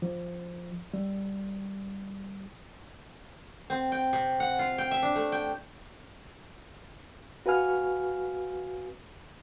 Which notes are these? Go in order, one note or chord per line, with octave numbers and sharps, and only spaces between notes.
F3
G3
C4
G5
C3
F#5
F4
G5
E5
D4
A3
G5
F#4 B4 F5 G#5 F6